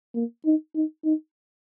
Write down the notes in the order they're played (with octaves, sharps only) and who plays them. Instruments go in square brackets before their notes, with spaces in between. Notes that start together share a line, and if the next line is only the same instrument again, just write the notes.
[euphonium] A#3
D#4
D#4
D#4